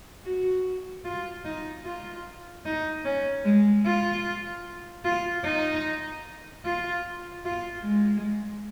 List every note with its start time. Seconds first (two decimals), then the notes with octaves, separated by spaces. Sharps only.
0.25 F#4
1.05 F4
1.45 D#4
1.85 F4
2.66 D#4
3.05 C#4
3.45 G#3
3.86 F4
5.05 F4
5.45 D#4
6.65 F4
7.45 F4
7.84 G#3